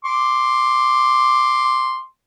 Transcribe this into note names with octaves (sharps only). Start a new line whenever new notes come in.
C6 D6